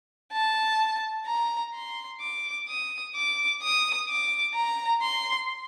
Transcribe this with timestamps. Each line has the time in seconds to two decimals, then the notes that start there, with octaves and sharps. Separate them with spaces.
0.33 A5
1.27 A#5
1.74 C6
2.21 D6
2.68 D#6
3.15 D6
3.62 D#6
4.09 D6
4.55 A#5
5.02 C6